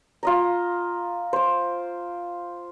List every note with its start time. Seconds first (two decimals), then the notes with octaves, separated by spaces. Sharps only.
0.23 F4 D#5 A#5
1.33 C5 D6